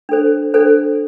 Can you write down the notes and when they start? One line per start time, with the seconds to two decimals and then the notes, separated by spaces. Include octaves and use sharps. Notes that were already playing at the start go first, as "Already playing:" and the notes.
0.09 D4 A4 C5
0.54 D4 A4 C5